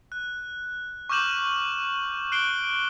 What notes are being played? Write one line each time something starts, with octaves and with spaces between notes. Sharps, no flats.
F#6
C#6 D6 F6 G6 E7 F#7
F#6 C7 D7 G7